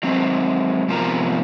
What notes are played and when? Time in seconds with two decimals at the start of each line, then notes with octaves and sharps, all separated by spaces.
0.03 F#3 G#3 C4
0.89 G#2 C3 F3 B3 A#4 A#5